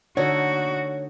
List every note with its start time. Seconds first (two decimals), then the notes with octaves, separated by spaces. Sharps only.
0.17 D3 A3 D#4 F#4 C#5